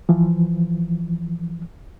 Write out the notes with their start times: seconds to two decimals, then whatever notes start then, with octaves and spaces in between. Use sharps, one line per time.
0.09 E3 F3